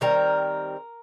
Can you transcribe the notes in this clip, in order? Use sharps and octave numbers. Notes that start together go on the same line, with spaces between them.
D#3 G3 C4 A#4